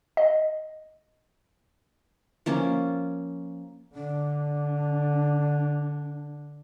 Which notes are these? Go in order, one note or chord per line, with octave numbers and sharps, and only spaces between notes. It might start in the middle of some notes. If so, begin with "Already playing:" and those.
D#5
F3 A#3 C#4
D3 D4